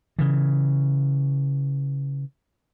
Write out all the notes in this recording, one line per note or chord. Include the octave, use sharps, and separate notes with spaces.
C#3 E3